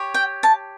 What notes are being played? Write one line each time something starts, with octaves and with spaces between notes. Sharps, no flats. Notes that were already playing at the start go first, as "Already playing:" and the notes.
Already playing: G4 C#5
G5
A5